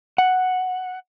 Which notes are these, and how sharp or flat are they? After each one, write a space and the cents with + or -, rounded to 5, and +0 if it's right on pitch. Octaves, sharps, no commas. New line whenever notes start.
F#5 +0